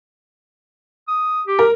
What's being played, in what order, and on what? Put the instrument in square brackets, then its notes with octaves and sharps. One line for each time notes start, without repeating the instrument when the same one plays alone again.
[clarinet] D#6
G4
[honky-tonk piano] A#4